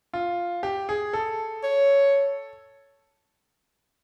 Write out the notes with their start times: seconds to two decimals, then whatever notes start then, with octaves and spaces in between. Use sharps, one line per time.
0.13 F4
0.63 G4
0.89 G#4
1.13 A4
1.63 C#5